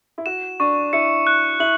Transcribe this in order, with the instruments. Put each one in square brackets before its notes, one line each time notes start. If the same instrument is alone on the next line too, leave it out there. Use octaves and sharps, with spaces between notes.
[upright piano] E4
[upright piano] F#4 [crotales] E7
[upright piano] D4 [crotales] C#6
[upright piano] E4 [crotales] C#7
[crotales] F#6
[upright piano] E4 [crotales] F#7